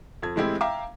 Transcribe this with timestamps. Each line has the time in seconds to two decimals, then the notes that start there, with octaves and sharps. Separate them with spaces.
0.22 F2 G#6
0.36 A2 E3 G#3 C4 E4 G4
0.61 E5 F5 G5 A#5 D6